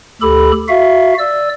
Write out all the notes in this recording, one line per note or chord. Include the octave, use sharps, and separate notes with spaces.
D2 G4 A4 B5
F#4 E5 F5
D5 E6